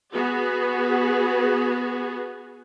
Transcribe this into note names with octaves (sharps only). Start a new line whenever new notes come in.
B3 F#4 G#4